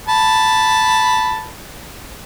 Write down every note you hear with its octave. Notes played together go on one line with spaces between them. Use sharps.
A5 B5